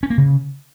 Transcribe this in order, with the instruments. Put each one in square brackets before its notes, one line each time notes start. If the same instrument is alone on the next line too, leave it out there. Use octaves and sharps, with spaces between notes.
[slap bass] C#4
A#3
C#3